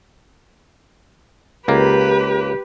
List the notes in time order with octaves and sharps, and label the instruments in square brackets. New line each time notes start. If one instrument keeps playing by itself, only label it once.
[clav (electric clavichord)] C#2 A#3 [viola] G4 B4